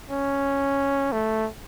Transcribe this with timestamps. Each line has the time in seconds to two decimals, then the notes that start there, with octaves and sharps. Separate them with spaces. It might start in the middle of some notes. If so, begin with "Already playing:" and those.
0.10 C#4
1.12 A3